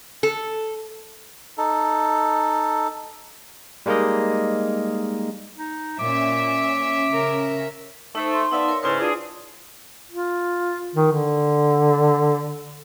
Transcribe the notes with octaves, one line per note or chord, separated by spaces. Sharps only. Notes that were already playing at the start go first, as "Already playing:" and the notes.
A4
D#4 A4
G3 G#3 A#3 D#4 A#4 D#5
D#4
A#2 C#4 E5 D6
C#3 A#4
A3 D#4 C5
C6
B3 D#4 D5 E5 F5 A5
A#4 C#5
G#2 C#3 E4 B4 C6
D4 F4 G#4
F4
D#3
D3